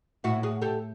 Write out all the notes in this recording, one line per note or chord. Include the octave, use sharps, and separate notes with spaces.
A2 E4 F#4
F#4 G#4
G4 A4